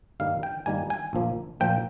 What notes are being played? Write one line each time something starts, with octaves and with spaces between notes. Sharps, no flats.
G2 D#3 G3 A#3 F5
G5
G2 D#3 G3 A#3 G#5
G#5
A#1 A#2 F3 A#3
A#1 A#2 F3 A#3 G5